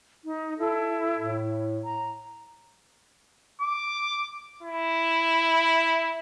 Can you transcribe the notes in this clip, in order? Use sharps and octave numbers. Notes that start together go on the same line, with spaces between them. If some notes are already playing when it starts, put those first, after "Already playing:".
D#4
E4 A4
A2
A#5
D6
E4